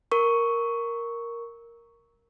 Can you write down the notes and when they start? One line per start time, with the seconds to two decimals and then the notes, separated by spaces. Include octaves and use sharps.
0.11 A#4 C#6